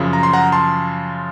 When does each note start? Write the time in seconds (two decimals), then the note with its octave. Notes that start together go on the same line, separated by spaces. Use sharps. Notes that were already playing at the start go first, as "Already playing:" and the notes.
Already playing: F#2 C#3 F3
0.13 A#5
0.23 C6
0.33 F#5 A#5
0.52 A5 C6